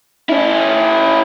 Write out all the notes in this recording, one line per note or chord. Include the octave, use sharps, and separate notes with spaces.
C#4 E4